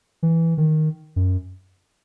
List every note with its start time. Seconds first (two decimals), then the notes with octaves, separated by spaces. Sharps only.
0.23 E3
0.58 D#3
1.16 F#2